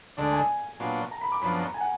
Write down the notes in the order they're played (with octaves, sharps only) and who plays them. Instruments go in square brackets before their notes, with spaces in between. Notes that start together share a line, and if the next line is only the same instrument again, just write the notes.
[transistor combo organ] D2 D3 G#3 D4 [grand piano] D5
[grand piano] G#5
[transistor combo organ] A#2 F#3 B3 D4 F4
[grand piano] A#5
B5
D6
[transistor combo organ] F#2 F3 B3 D4 [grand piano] B5
[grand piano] A#5
G#5
F#5